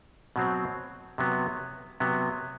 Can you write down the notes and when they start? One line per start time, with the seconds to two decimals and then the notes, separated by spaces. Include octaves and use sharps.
0.36 B2 F#3 C4
1.18 C3 F#3 B3
2.00 C3 F#3 B3